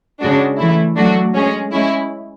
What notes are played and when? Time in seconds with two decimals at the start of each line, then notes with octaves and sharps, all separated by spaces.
0.21 C#3 G#3 D4 F#4
0.58 E3 A3 E4
0.96 F#3 A3 D4 F#4
1.34 G#3 C#4 G#4
1.72 G#3 C#4 E4